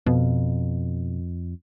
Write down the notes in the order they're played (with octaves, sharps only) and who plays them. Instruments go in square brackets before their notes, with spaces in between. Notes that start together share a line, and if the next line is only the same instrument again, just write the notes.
[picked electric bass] F2 [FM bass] B2